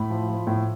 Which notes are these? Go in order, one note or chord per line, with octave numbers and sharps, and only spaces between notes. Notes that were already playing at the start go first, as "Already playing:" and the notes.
Already playing: A2 B5
F3
F3
A2